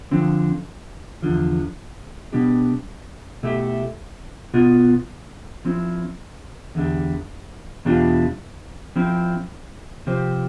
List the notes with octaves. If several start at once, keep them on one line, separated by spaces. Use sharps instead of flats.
D3 F3 C4
E2 D3 F3
B2 G3 B3 D4 G4
B2 A3 E4 G4
B2 B3 F4
F3 C4 E4
E2 D3 G3
E2 B2 G3 D4 F4
F3 C4 E4
C3 F3 C4 G4 C5